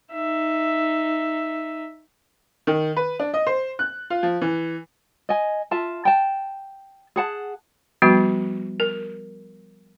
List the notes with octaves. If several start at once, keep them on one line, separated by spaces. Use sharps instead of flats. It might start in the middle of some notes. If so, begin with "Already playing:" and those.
D#4 E5
D#3
B4
D4
D#5
C5
F#6
F4
F3
E3
D#5 G#5
F4 E5 A5
G5 A5
G#4 F#5 A5
F3 G3 B3 F#4
A#4